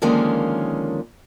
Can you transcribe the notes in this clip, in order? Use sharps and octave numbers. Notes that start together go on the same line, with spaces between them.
D3 D#3 F3 G#3 A#3 C#4